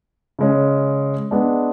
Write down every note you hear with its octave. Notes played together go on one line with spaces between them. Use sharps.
C#3 G#3 C#4
G#3 B3 D4